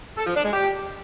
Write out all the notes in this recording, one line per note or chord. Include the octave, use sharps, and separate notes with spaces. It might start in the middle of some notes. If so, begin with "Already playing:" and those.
A4
F3
D4
G#3
G4